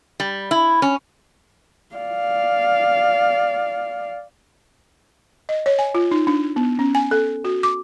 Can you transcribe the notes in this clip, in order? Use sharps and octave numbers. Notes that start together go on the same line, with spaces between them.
G3
E4
C#4
D5 F5
D#5
C#5
G#5
F4
D#4
D4
B3
C#4
G#5
A4
F#4
D6